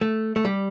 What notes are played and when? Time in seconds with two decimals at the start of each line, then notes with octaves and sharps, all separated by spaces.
0.01 A3
0.36 A3
0.45 G3